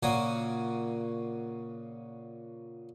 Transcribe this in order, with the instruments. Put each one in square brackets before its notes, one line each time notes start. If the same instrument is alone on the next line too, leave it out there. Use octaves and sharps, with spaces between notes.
[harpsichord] A#2 C#3 A#3 F#4 G#5 D#6